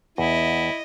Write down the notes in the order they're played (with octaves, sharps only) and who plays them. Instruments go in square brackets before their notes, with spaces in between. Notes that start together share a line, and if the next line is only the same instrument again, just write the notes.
[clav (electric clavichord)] E2 [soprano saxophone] E4 [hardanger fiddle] D#5